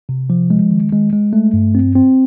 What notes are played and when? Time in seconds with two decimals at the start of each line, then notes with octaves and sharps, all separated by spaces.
0.09 C3
0.30 F3
0.50 G#3
0.71 D#3
0.92 G#3
1.13 G#3
1.33 A3
1.53 G2
1.75 C4
1.95 C4